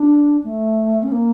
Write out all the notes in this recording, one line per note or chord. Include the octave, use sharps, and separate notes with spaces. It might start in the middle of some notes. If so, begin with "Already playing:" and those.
Already playing: D4
A3
C#4
A#3